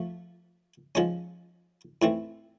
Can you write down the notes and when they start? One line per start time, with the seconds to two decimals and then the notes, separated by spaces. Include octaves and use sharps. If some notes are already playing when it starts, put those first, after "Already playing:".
Already playing: F3 A3
0.95 F3 G#3 C#4
2.02 A2 E3 A3 C4